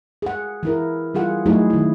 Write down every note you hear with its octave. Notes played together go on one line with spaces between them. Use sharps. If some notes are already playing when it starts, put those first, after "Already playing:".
G#4 F#5
E3 E4 A#4
E3 G3 F4 G#4 F#5
F#3 A3 D#4 E4 F#4 G#4
D#3 E4